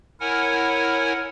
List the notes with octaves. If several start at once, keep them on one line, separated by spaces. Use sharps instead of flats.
E4 A#4 C#5 F#5 G#5